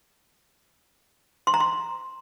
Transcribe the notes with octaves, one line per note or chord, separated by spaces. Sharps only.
C6
A#5
C6